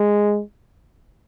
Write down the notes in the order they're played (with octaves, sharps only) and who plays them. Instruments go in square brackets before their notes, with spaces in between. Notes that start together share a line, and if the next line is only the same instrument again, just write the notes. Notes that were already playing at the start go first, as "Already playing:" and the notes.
Already playing: [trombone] G#3